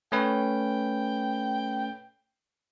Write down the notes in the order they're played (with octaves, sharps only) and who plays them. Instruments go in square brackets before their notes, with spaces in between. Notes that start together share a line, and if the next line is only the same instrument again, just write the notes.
[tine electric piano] A3 C#4 B4 [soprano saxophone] G5